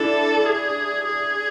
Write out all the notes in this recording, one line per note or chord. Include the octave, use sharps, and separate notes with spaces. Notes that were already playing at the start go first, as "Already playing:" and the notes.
Already playing: D4 E4 A4
G#4
G#4